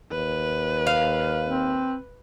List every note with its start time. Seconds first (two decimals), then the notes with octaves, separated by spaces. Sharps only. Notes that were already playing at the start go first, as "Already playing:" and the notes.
0.12 D#2 B4
0.87 F5
1.47 C4